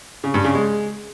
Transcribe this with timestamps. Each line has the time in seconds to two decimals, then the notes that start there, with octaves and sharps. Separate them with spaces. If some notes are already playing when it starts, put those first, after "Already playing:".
0.24 C#3
0.34 G2
0.44 C#3
0.55 G#3